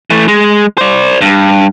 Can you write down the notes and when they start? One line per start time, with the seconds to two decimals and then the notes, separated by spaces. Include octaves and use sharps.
0.10 E3 A3
0.28 G#3
0.78 C5 D5
1.21 G2